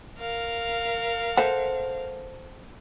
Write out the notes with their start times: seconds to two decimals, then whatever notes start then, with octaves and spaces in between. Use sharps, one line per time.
0.19 A#4 F5
1.37 A4 C5 F#5